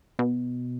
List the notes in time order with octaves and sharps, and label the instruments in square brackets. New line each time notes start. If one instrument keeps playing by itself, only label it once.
[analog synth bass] B2